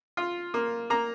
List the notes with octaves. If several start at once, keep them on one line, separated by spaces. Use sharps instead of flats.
F4
A#3
A#3 A#5